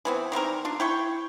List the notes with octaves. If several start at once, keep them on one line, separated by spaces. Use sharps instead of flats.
E3 B3 C4
D#3 G3 C4 A#4
D4 F4
E4 G5 C#6